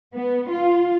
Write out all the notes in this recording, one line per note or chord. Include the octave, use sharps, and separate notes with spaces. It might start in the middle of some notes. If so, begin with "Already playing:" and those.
B3
F4